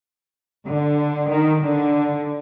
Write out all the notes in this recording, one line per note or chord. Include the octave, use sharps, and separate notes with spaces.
D3
D#3
D3